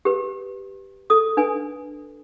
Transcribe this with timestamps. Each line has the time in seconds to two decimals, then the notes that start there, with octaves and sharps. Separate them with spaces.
0.05 G4 B4
1.10 A4 D#6
1.37 D4 B4 G#5